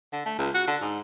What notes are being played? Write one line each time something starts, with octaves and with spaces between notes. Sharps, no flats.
D3
A3
C#2
F#4
D3
G#2